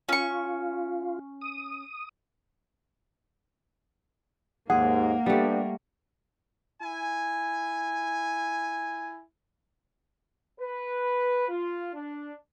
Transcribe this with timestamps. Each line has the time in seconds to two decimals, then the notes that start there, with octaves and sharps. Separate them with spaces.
0.09 C#4 F4 C#6
1.41 D#6
4.70 D#2 G#2 A#3 G#4 F#5
5.26 G3 A3 B3 D4 G4
6.82 E4 G#5
10.60 B4
11.49 F4
11.94 D4